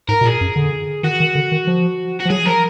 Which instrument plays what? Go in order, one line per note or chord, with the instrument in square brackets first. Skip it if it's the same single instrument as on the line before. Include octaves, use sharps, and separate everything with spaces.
[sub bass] G#2 [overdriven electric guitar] A#4
[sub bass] B2
[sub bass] A#2 [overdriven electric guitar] G#4
[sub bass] F#2
D3
[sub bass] D#3 [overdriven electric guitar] F#4
[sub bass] D#3
D3
D#3
F3
[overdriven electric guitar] F#4
[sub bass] F3
[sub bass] F#3 [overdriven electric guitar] G#4
[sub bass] F3 [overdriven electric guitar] A#4